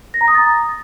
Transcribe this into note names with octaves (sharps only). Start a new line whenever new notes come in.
A#6
A#5
D#6
A6